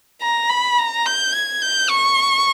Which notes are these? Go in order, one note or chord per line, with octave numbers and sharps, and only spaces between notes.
A#5
B5
A#5
G6
G#6
G6
C#6